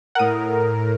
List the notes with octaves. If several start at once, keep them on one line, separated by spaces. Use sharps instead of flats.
A2 A#4 F#5 D#6